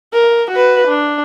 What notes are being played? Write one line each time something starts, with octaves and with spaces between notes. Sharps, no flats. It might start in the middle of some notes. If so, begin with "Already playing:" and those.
A#4
F#4 B4
D4